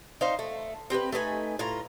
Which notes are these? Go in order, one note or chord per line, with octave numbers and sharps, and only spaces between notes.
D#4 C5 F5
A3
C4 G4 A4 B4
A3 D#4 B4 G#5
A2 F4 A#5